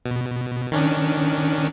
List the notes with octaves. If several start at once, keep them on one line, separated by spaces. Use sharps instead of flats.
B2
D#3 C#4 D4